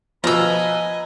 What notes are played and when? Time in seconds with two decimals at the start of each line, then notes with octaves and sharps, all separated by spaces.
0.24 B2 F3 B4 D#5 G#5 A#5 E6